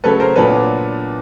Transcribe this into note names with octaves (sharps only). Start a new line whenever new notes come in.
C#3 F#3 A3 C#4 A4 B4
A#4 C5
A#2 F#3 B3 D4 A4 B4